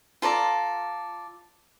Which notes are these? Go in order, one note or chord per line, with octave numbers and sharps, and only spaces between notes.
F4 A4 D5 A#5